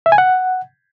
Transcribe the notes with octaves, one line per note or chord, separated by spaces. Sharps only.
E5
G#5
F#5